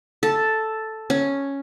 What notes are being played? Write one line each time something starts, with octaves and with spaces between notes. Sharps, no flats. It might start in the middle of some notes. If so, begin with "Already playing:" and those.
A4
C#4